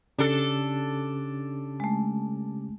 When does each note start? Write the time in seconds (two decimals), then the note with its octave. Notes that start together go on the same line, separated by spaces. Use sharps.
0.19 C#3 C#4 D4 G4 A4
1.80 G#3 A3